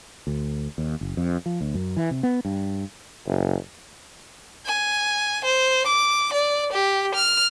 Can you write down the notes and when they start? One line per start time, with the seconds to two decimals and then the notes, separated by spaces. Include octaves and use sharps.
0.27 D2
0.78 D#2
1.01 F#1
1.17 F2
1.46 F3
1.61 D2
1.75 F#2
1.97 E3
2.11 C3
2.23 B3
2.45 G2
3.26 F#1
4.66 G#5
5.45 C5
5.87 D6
6.33 D5
6.73 G4
7.15 F6